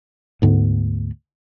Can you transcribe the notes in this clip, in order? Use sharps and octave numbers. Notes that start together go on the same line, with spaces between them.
D2 G#2 D3 B3